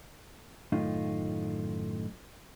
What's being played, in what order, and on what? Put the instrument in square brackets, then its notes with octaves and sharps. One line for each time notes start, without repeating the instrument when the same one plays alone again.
[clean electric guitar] F#2 A2 D#3 A3 D#4 F4